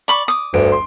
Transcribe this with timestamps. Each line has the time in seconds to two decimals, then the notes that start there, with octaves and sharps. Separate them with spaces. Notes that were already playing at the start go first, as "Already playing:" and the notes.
0.08 D5 B5 C#6
0.28 D6 D#6
0.54 G1 D2 B3 D7
0.72 C6